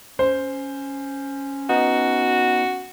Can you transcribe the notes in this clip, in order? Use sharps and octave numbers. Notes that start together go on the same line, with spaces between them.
C#4 C5
B3 D#4 F#4